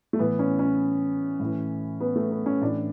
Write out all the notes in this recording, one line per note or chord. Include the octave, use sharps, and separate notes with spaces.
A3
A2 E3 B3
C#4
C#4
A2 E3
B3
A3
B3
C#4
A2 E3 D4